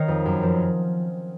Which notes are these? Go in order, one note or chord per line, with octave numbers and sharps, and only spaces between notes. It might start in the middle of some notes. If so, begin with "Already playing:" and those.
Already playing: D#3 C#5 D#5 F5
F2
F#2
F3